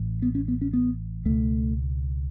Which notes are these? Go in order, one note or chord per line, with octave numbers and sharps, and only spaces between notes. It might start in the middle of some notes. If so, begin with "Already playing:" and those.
Already playing: A1 A2
B3
C#4
B3
C#4
B3
C#2 B2 A3